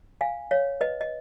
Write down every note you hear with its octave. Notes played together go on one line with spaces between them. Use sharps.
F5 G#5
C#5 F5
B4 D#5
D#5